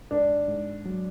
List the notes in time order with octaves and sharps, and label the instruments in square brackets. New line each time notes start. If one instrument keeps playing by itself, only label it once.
[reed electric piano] G#2 [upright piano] D4
[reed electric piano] G#2
F#3